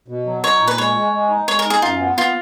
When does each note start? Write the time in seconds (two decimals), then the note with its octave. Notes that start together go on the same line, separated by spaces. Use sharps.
0.08 B2
0.26 F#3
0.43 D#4 C#5
0.60 A#2
0.67 B4
0.78 G#3 C#5
0.96 G#3
1.13 G#3
1.30 D#4
1.47 G#3 C#5
1.59 A#4
1.66 D#4 G#4
1.82 F#2 F4
1.99 B3
2.18 B3 F4